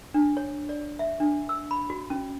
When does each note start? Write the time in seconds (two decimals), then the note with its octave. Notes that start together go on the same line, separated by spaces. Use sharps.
0.14 D4
0.37 C#5
0.69 D5
0.99 E5
1.20 D4
1.49 E6
1.71 B5
1.90 F#4
2.10 C#4